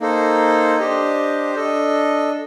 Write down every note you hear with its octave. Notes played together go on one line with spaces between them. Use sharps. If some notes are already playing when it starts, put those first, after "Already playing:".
A#3 D#4 A4 C5
D4 G4 C5 D#5
D4 A4 D#5